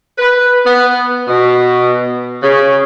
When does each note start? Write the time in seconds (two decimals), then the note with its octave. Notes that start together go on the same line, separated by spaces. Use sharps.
0.18 B4
0.64 B3
1.28 B2
2.42 C#3